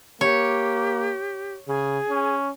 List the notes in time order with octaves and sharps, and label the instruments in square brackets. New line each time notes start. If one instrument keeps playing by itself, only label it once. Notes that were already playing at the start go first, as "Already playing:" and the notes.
[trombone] A#3 [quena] G4 [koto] C#5
[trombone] C#3 [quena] G#4
[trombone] C#4